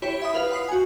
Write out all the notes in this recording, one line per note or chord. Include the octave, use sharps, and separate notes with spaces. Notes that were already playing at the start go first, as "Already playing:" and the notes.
E4 G4 C#5 B5
E5 B5 D#6
F4 B4 F5 F7
F#5 B5 D#6 C7
F#4 G#5